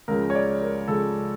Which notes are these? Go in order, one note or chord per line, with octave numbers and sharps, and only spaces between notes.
C#2 C#3 F3 A#4
C#5
D5
A#4
C#2 C#3 F3 A4